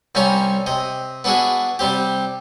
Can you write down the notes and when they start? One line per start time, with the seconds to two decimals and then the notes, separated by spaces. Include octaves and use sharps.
0.15 C2 G3 C#4 G#5 A#5 C#6
0.66 C3 D#5
1.24 B3 D4 E4 F#4 G#4
1.79 C3 G3 C4 G4